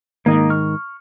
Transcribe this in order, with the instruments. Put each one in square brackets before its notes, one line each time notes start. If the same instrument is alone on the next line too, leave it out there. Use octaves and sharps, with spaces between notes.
[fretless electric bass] G#2 D#3 [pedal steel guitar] A#3 D#5
[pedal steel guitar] C#6 F6